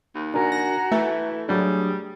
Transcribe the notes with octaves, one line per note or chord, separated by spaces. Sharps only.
D#2
D4 F#4 A#4 G#5 A#5
A#6
E3 A3 E5
F#3 G3 D4 G#4